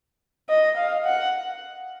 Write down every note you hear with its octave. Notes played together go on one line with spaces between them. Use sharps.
D#5
F5
F#5